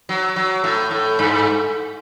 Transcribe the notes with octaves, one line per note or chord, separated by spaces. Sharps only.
F#3
F#3
A2
A2
G2